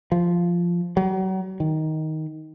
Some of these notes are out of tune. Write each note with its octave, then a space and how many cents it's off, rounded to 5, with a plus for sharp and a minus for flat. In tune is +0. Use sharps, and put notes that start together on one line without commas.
F3 -5
F#3 +35
D#3 +10